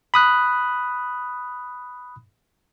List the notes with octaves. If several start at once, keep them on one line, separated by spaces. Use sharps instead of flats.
B5 D#6 F#6